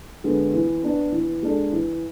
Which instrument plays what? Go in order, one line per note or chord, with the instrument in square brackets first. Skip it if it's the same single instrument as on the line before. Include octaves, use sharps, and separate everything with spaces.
[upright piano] D3 G#3 B3
E3
B3 D4
E3
G#3 D4 A4
E3